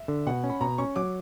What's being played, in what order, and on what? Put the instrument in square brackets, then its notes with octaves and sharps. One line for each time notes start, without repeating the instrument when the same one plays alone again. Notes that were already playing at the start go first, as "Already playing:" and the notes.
Already playing: [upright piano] E5
[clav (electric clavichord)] D3
[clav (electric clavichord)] B2 [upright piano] F#5
[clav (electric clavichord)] C#4
[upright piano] B5
[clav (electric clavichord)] B2 [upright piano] A#5
[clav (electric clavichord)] C#4 [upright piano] C#6
[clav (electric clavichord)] F#3 [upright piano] D6